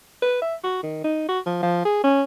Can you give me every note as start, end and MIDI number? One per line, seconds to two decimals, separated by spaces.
0.22 0.40 71
0.42 0.55 76
0.64 0.80 66
0.83 1.01 51
1.04 1.28 63
1.28 1.39 66
1.46 1.61 53
1.63 1.82 53
1.85 2.03 68
2.04 2.23 61